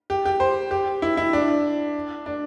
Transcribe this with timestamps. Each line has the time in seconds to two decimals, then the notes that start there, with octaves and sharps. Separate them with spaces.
0.10 G4
0.25 G4
0.40 C5
0.71 G4
1.02 E4
1.17 E4
1.33 D4
2.26 D4